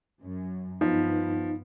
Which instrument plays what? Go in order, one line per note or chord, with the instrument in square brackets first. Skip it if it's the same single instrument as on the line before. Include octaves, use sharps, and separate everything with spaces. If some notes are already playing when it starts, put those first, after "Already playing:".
[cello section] F#2
[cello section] G2 B3 [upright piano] F3 [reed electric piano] D#4